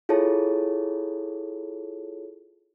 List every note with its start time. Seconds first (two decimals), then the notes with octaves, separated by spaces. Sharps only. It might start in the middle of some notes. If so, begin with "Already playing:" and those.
0.09 E4 F4 G#4 A4 C#5 A5